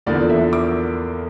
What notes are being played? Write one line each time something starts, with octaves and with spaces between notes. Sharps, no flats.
E2 D3 F3 A#3 D5
E5
D6